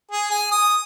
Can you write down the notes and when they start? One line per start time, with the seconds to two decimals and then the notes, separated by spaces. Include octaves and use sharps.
0.12 G#4
0.31 G#5
0.52 D#6